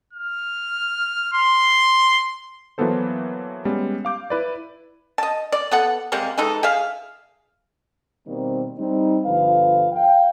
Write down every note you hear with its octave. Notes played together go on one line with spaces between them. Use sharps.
F6
C6
E3 F#3 A#3 B3 A4 C5
G3 G#3 B3 C#4
F5 D6 G6
E4 B4 D5
D#5 A5
D5
B3 A4 F#5
C3 G3 G#3 A#3
E3 G#3 D#4 A4
G#4 E5 F5
B2 D#3 G3 A#3 C4
G3 C4 D#4
G1 D3 F3 B4 F5
F5 G5